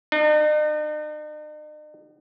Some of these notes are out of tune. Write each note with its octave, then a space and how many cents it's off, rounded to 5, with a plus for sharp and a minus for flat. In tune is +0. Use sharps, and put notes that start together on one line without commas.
D#4 -45